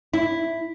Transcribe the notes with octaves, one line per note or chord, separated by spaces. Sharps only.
E4